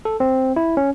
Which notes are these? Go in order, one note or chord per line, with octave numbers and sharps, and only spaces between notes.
A4
C4
E4
C#4